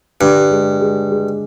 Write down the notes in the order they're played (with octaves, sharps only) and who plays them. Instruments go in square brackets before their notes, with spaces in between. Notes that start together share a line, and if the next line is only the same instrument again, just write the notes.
[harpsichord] G2 [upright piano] D3
[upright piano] G#3
G#3
G#3